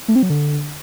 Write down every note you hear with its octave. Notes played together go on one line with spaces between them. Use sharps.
A3
C4
F#3
D3